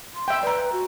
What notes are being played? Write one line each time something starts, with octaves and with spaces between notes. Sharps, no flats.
C6
E5 G5
B4 D5 A#5
F#4